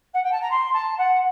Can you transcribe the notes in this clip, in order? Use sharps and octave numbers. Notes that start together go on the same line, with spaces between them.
F#5
G5
A5
A#5
C6
A5
F#5